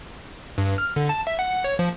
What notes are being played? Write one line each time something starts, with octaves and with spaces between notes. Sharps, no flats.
G2
F6
D3
A5
E5
F#5
C#5
F3